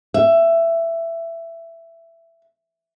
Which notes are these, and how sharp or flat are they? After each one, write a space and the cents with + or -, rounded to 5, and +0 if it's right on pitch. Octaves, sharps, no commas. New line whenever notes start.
E5 +15